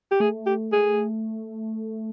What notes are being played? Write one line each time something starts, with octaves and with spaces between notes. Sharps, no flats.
G4
A3 G#4
G4
G#4